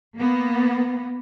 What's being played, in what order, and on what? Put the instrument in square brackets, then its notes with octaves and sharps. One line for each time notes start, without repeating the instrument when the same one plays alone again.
[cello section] A#3 B3